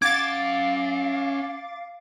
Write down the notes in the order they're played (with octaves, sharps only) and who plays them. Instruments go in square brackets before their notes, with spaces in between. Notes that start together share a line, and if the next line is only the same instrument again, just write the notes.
[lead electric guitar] C#4 F#5 [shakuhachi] F5 [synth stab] D6 A6 [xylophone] G#6